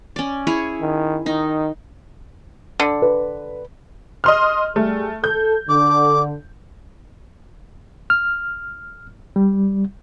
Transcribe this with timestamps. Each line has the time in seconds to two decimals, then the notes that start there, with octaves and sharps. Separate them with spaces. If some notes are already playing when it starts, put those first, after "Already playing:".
0.16 C#4 D5
0.47 E4 G#4 C#5
0.81 D#3
1.26 D#3 D#4
2.80 D3
3.02 B4
4.24 D#5 C6 F6
4.76 G3 A3 G#4
5.24 A4 G6
5.69 D3 D6
8.10 F6
9.36 G3